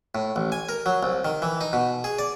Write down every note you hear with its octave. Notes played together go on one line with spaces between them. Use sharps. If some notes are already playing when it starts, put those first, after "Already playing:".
A2
A1
G#5
A#4
F#3
C2
D#3
E3
D#4
B2
G#4
D5